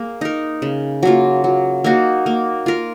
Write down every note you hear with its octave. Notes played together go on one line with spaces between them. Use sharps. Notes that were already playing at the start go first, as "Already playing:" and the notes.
Already playing: A#3 G#4
D#4 A#4
C#3
F#3 A#3 F4
F#3
A#3 D#4 F#4
A#3
F4 A#4